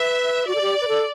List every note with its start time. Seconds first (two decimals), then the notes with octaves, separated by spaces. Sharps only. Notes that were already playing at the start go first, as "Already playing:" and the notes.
Already playing: B4 E5
0.47 F#4 D5
0.55 A4
0.61 G4
0.81 B4
0.88 A4